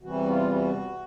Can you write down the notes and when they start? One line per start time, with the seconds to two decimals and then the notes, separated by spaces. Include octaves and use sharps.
0.03 E2 C3 E3 G3 F#4
0.27 F4
0.52 F#4